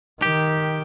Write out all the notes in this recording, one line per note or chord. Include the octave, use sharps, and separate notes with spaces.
D#3 G4